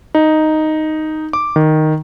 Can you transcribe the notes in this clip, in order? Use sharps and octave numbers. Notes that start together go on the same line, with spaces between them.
D#4
D6
D#3